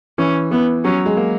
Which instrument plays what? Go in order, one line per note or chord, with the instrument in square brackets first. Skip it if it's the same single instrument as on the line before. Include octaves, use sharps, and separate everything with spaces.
[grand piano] E3 [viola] C#4
[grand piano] E3 [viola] B3
[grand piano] F#3 [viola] C#4
[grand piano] G#3
A#3